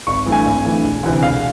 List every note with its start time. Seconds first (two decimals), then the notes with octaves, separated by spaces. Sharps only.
0.07 G#1 C#6
0.26 G2 E3 A3
0.32 G#5
0.45 G#1
0.65 G2 E3 A3
0.84 E1
1.03 D2 C3 E3
1.22 E1 F5